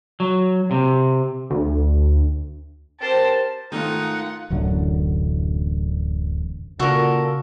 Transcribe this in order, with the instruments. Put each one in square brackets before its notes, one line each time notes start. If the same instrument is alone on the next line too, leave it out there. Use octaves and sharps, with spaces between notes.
[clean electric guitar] F#3
C3
[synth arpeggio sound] D2
[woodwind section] C4 A#4 A5 [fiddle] G4 C5
[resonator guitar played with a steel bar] G#2 D#3 [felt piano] A3 [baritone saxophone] D#4 [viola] F4 F#5
[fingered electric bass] D1 A1 F#2 D3
[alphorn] A#2 [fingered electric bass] C#3 [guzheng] F#4 [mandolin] A4 A#4